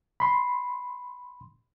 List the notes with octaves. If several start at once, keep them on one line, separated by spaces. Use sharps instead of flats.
B5 C6